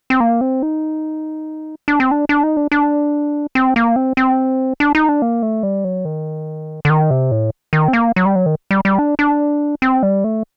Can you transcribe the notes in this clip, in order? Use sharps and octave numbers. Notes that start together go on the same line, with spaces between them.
C4
A#3
C4
D#4
D4
C4
D4
D4
D#4
D4
D4
C4
A#3
C4
C4
D4
D#4
D4
A#3
A3
G3
F#3
D#3
D3
D#3
C3
A2
D#3
C4
A#3
F#3
G3
F#3
D#3
G3
G3
D4
D4
C4
G3
A3